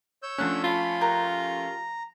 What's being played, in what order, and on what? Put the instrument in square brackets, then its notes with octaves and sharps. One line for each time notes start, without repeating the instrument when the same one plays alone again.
[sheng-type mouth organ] C#5 E6 G6
[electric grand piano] F3 A3 C#4 [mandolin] D4 F#5 F#6
[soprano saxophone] F4 [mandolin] A5 [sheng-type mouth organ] B5
[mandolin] G4 A#4 F#6 [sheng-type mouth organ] A#5